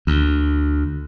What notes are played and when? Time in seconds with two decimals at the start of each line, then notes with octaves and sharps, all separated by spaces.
0.07 D2